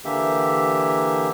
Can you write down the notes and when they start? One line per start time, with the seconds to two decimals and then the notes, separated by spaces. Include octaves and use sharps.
0.05 D3 E3 A#3 G4 E5